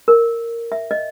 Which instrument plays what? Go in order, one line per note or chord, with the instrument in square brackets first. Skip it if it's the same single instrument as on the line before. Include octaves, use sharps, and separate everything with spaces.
[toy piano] A#4
E5
D#5